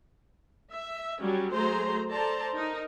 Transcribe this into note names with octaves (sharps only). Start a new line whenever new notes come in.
E5
F#3 G3 C#4
F#3 A3 G#4 C5 A#5 C6
A4 C5 D5 A5 A#5
D#4 A#4